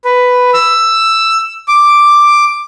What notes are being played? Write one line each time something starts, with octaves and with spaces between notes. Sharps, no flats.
B4
E6
D6